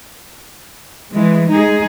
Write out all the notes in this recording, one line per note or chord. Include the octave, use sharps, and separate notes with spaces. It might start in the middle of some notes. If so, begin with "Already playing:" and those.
E3 G#3
G#3 D#4 G#4